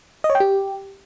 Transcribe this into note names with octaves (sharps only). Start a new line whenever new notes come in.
D#5
C#5
G5
G4